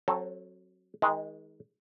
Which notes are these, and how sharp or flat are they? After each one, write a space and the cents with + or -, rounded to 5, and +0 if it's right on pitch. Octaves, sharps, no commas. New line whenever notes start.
F#3 +0 C4 +40 A4 +0
D#3 +35 G#3 +0